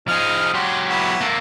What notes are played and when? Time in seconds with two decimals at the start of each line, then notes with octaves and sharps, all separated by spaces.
0.08 F3 D#4 G#4 F6
0.54 F#3 F#4 G4 C6
0.89 B3 E4 F#4
1.21 A#3 A4